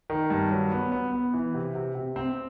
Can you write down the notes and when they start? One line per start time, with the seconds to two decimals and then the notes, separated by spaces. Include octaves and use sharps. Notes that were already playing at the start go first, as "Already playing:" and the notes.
0.10 D#3
0.30 G2
0.51 F#3
0.72 B3
0.92 B3
1.12 B3
1.34 E3
1.54 C3
1.75 C3
1.95 C3
2.16 C4